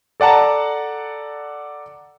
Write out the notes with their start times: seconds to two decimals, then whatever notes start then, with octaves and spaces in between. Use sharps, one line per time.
0.20 A4 D5 F#5 A5 A#5